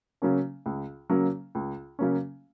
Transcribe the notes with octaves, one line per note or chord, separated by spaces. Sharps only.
C#3 F#3 A#3 C#4
C#2
C#3 F#3 A#3 C#4
C#2
C#3 F#3 A#3 C#4